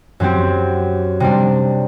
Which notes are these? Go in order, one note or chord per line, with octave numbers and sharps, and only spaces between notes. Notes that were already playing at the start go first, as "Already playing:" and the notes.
F#2 F#3 C4 G4
C3 G3 D4